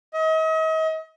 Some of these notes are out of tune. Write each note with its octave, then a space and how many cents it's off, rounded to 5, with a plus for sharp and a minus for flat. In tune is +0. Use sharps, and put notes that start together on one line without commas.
D#5 +40